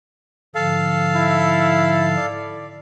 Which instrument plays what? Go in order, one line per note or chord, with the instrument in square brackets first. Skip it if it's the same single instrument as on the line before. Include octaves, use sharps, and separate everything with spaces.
[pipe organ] G#2 D3 F3 [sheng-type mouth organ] A4 F5
[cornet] E4
D5